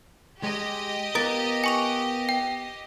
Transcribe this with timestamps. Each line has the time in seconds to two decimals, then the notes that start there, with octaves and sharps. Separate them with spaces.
0.43 G#3 G4 D#5
1.15 B3 F4 A#4 D#6 A6 D7
1.64 G#5 C#6 F7
2.29 G5